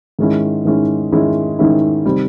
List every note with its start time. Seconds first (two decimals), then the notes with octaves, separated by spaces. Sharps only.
0.19 G#2 D#3 G#3 C#4 E4
0.65 G#2 D#3 G#3 C#4 E4
1.12 G#2 D#3 G#3 C#4 E4
1.59 G#2 D#3 G#3 C#4 E4
2.05 C3 D#3 G3 C4